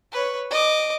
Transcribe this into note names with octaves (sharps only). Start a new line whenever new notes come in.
B4 C#5
D#5 D6